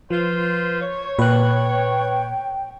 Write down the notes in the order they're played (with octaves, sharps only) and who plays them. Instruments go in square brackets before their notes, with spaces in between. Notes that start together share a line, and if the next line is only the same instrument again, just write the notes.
[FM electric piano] F3 [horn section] F4 B4 C5
[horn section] C#5
[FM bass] A#2 [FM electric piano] B4 F#6 [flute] G5